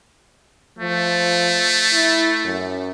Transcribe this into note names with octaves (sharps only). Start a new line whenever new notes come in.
F3 A3
E4
F#2